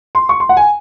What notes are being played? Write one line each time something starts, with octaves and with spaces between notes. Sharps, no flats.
C6
C#6
C6
F#5
G#5